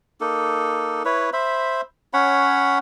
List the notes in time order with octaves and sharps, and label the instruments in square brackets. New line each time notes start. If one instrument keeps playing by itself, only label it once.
[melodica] A#3 D#4 A4
E4 B4 C#5
C5 E5 B5
C#4 C#5 F#5 B5